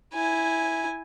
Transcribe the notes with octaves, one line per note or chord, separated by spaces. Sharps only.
E4 G#5